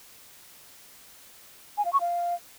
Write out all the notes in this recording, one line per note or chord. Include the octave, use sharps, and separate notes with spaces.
G#5
F5
C#6
F5